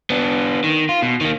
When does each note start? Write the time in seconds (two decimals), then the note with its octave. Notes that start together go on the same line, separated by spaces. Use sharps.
0.10 B3 D4
0.64 D#3
0.89 F4
1.02 B2
1.21 D#3 A#3